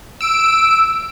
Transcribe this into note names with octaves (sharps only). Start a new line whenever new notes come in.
E6 D7